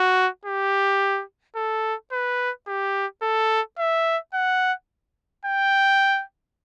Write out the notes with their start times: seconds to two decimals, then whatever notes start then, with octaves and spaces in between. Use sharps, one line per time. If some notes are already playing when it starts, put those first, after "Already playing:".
Already playing: F#4
0.45 G4
1.56 A4
2.12 B4
2.67 G4
3.22 A4
3.78 E5
4.34 F#5
5.45 G5